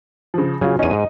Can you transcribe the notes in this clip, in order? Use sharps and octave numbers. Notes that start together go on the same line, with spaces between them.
C#3 F3
C#3 F#3 F4 G#5
E2 C#4 D#4 D#7
G#2